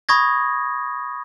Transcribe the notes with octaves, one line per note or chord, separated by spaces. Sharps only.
B5 C#6 D#6 G#6 A#6